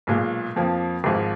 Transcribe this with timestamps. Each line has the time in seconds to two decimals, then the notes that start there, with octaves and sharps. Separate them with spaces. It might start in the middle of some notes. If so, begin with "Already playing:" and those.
0.07 B1 A#2 G#3
0.56 F2 F3 A#3
1.04 G#1 G#2 F3 G#3